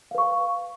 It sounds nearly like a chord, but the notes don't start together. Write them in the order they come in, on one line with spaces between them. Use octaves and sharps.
F5 B4 C#6